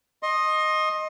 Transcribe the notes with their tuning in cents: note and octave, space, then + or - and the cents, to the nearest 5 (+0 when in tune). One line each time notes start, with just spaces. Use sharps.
D#5 +0 C6 +30